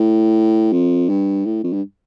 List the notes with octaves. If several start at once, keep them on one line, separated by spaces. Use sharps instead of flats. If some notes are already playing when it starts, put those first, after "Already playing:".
Already playing: A2
F2
G2
A2
F2
G2